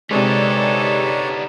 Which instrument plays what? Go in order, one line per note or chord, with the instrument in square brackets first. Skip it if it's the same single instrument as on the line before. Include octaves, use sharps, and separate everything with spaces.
[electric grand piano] C3 G#3 [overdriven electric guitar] G3 B3 [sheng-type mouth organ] D4 C#5 [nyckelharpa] D#4 A4